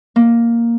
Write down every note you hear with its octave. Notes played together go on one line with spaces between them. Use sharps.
A#3